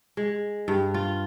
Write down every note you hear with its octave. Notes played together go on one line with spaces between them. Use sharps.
G#3
G2
F4